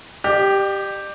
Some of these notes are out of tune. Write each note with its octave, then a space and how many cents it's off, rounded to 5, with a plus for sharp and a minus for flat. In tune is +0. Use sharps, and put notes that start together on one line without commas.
G4 +0 D5 +45